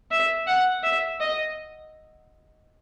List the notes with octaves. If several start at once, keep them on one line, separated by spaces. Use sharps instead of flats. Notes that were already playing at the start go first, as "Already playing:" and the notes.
E5
F#5
E5
D#5